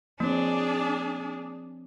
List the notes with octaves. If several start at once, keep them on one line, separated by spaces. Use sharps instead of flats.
F3 A#3 C4 D4 G#4 C#5